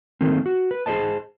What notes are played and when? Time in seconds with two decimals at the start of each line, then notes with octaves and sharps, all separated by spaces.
0.21 D#3 A3 A#3 C4
0.46 F#4
0.71 B4
0.86 G#4 A#4 C5 D#5 A5